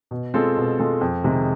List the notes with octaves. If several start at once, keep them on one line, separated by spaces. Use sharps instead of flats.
B2
G#3 C4 F4 A4
B2
G#3 C4 F4 A4
F2
C3 D#3 G#3